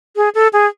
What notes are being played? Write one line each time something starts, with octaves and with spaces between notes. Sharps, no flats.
G#4
A4
G#4